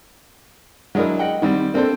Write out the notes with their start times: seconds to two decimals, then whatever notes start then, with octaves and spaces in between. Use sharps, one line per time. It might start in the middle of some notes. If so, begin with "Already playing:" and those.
0.95 F#3 G#3 D4 E4 A#4
1.19 D#5 F#5 G5
1.42 D#3 G3 C4
1.74 A#3 C4 D4 A4 C5